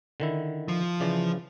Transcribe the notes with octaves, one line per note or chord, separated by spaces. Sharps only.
D3 D#3 E4
F3
C#3 E3 D5